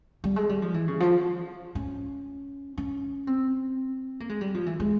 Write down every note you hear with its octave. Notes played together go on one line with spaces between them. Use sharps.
G3
G#3
G3
F3
E3
C#3
F3
C#4
C#4
C4
A#3
G#3
G3
F3
E3
G#3